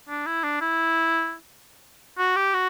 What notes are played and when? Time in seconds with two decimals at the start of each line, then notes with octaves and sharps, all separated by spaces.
0.09 D4
0.26 E4
0.44 D4
0.61 E4
2.18 F#4
2.36 G4
2.54 F#4